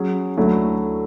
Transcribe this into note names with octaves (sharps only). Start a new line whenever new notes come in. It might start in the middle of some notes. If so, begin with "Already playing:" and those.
Already playing: F#3 C#4 G#4
D2 D3 F#3 A3 E4